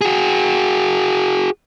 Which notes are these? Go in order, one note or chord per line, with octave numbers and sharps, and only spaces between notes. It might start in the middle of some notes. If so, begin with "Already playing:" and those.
F#4 G#4